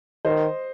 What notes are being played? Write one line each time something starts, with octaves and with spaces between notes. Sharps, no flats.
D#3 C5 D#5